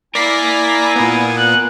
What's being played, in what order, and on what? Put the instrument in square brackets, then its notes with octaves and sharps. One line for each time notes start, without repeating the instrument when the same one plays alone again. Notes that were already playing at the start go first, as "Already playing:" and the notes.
[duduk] E4 [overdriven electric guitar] A#4 F5 [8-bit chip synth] D5 A#6 B6 [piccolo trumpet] G#5
[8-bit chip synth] A#2 B3
[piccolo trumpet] F#6